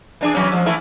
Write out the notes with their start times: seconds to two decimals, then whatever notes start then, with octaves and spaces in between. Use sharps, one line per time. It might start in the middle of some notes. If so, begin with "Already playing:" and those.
0.21 E3 D4 G#4
0.35 E3 F#3 C#4
0.52 F3 G#3
0.66 E3 A3 E4